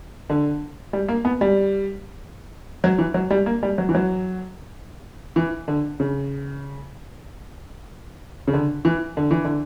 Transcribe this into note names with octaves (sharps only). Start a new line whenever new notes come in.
D3
G3
A#3
B3
G3
F#3
E3
F#3
G3
A#3
G3
F#3
E3
F#3
E3
D3
C#3
C#3
D3
E3
D3
E3
D3